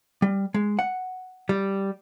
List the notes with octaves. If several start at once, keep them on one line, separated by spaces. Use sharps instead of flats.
G3
G#3
F#5
G3